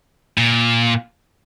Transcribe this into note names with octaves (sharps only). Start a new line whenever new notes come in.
A#2